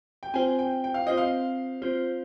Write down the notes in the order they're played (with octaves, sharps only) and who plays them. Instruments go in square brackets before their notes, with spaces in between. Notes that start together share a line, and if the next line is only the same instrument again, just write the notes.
[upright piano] G5
[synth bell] C4 F4 C5 [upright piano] G#5
[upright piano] G5
G5
F5
[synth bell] C4 F4 C5 [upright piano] D#5
[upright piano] F5
[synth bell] C4 F4 C5